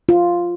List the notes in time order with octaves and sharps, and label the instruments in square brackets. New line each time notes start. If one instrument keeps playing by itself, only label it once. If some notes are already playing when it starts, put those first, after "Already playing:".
[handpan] F4